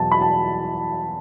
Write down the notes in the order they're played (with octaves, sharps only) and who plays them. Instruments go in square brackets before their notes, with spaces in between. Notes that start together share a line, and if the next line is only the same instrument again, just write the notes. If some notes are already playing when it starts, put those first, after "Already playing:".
Already playing: [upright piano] E2 B2 F#3 A5
B5
A5